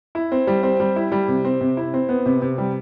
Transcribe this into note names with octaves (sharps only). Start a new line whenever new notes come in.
E4
C4
G3
C4
G3
E4
G3
C3
C4
C3
E4
C4
B3
C3
C3
G3